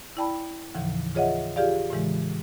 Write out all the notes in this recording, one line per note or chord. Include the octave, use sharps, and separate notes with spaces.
E4 D5 G5 A5 B5
D#2 A2 C#3 E3 F3
F4 G#4 C#5 D#5 E5 F#5
F4 G4 G#4 D5 F5
A2 C#3 E3 G#3